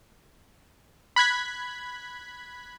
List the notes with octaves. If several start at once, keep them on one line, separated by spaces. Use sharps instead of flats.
B5 F#6 G#6 B6